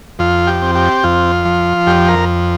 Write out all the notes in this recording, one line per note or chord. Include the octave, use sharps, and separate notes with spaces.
F2 F4
G4
C4
G4
F2 F4
F3
F2 G4
A#4